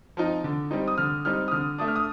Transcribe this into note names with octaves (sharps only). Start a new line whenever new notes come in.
F3 C4 D#4
D3
G3 C4 D#4
D#6
D3 F6
G3 C4 D#4 F6
D#6
D3 F6
A3 D4 D#6
F6
D#6